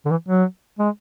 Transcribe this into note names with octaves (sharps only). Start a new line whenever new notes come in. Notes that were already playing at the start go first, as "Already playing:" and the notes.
D3
E3
F#3
G#3